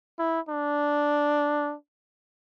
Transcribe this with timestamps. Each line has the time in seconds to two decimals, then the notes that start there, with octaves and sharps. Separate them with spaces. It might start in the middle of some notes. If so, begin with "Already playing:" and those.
0.19 E4
0.49 D4